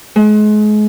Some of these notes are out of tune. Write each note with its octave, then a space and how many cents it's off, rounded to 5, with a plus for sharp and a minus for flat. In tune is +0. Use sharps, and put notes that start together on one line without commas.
G#3 +35